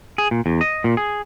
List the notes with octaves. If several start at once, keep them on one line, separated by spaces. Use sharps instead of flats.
G#4
A#2
E2
D#5
A#2
G#4